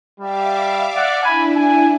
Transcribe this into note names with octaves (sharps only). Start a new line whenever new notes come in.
G3 E5 F5 D6
D5 F#5
D4 E4 G#5 B5
G#5